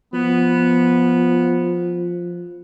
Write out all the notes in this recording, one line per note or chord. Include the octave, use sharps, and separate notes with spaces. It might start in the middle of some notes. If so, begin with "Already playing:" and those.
F3 B3